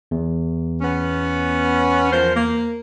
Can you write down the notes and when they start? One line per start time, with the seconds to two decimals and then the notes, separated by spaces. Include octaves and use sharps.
0.11 E2
0.82 B3 C#4
2.12 F3 A#4 C5
2.35 A#3